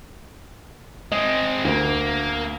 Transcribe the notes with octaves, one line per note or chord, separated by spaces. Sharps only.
G#3 C4 D#5
D2 A#3